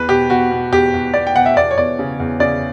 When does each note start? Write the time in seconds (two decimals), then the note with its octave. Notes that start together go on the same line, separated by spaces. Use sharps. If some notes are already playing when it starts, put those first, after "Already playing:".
Already playing: E2 B4
0.09 B2 G4
0.30 B2 F#4
0.51 B2
0.72 E2 G4
0.94 E2
1.14 B2 D5
1.27 G5
1.36 B2 F#5
1.46 E5
1.56 E2 D5
1.71 C#5
1.77 E2 D5
1.99 C#3
2.20 E2
2.40 C#3 D5